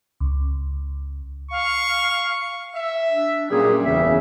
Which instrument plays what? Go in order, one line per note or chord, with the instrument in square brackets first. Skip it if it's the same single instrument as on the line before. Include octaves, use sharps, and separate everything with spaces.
[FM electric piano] C#2
[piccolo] F5 [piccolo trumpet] C#6
[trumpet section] E5
[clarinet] D4
[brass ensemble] F#2 A#2 [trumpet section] G3 [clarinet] G#4
[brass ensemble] F#1 E2 C#3 [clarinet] E5